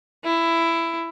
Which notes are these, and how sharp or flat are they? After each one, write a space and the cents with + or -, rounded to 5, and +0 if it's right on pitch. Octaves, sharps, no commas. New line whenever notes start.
E4 +15